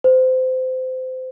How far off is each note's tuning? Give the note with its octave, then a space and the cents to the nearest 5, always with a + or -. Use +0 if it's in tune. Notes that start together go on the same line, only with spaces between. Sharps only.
C5 -25